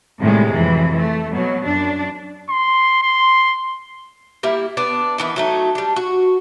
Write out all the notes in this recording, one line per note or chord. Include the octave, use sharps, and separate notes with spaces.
A2 C3 D#3 G3 G#3
F2 E3 F#3
A3
B2 F#3
F#2 D4
C6
C6
G3 A#3 E4
B3 D4 D5
D#3 E3 B3
F#3 A3 D#4
G3 D4
F#4